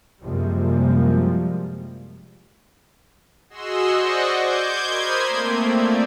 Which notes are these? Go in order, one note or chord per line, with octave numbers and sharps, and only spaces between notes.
F#2 C3 F3 G3 G#3 A#3
F#4 G#4 D#5 C6 E6
C5 D5 D#5 F#5 C#6
D6 G6 G#6
A#4 C5 B5 C6 D#6 G#6
A3 A#3 C4
F4 D5